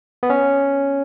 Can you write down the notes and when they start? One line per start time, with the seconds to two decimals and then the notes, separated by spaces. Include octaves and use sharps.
0.23 B3
0.30 C#4